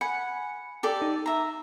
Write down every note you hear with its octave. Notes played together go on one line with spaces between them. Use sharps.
F#5 G#5 B5 C#7
G4 A4 D5
D#4
E5 A#5